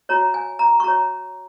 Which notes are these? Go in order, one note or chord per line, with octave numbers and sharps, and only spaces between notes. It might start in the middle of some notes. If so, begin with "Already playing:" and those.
F#4 C#5 A#5
G#5
A#5
C#6
F#4 C#5 A#5